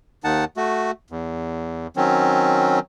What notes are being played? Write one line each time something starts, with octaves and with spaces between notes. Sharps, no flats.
D#2 D#3 D#4 F#5 A5
A3 F#4
E2
D#3 F#3 C4 C#4